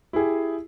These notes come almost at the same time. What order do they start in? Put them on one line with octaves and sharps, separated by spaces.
E4 G#4 G4